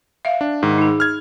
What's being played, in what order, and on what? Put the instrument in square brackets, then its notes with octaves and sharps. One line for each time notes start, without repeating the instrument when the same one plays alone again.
[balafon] E5 F5
[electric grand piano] D4
G#2 D#3
[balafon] D#4 G#4
[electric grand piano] F6 G#6